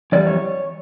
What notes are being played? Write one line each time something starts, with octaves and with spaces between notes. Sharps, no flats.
F2 E3 G3 D5
C#5